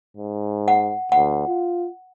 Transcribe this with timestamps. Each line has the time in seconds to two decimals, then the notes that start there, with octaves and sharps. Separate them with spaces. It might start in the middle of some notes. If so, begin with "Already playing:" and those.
0.17 G#2
0.68 F#5
1.12 D2 F#5
1.47 F4